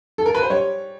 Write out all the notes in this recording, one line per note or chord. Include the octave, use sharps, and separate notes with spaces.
A4
A#4
B4
C5
G3 C#5